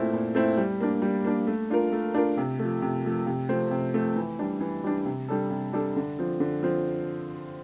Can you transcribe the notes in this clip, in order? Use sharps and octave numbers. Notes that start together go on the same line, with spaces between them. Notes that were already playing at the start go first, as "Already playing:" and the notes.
Already playing: A#2 A3 C4 E4
A#2
A3 C4 E4
G3
A#3 D4
G3
A#3 D4
A3
D4 F4 A#4
A3
D4 F4 A#4
C3
F3 A3
C3
F3 A3
C3
F3 A3 C4
C3
F3 A3 C4
E3
G3 D4
E3
G3 D4
C3
G3 D4 A4
C3
G3 D4 A4
D3
F3 C4
D3
F3 C4